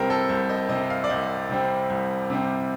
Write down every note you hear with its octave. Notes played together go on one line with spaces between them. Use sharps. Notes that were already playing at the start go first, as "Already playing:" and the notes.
Already playing: C2 C3 G3 C4 A#4 C5
A4
C2 C5
D#5
C3 G3 C4 D#5
F5
D5
C2 D#5
C3 G3 C4
C2
C3 G3 C4